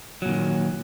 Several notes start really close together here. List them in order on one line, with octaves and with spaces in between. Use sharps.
F#3 A#2 D#3